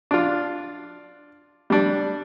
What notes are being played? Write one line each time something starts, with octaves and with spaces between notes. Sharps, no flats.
D4 F4
G3 D4